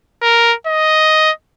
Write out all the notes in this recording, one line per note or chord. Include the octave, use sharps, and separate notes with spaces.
A#4
D#5